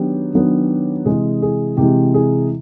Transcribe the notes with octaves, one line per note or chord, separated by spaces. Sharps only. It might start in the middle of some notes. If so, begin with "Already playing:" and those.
Already playing: D#3 F#3 B3 D4 G4
D#3 F#3 B3 D4
C3 E3 G#3 G#4
G#4
C3 E3 G#3 G4
G#4